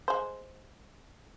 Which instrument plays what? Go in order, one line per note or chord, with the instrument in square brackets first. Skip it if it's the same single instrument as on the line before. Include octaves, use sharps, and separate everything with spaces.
[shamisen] G#3 C5